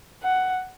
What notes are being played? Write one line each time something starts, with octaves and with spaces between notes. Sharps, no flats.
F#5